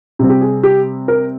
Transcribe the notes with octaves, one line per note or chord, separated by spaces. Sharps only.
C3 G3 C4
G4
G#4
G4
A#4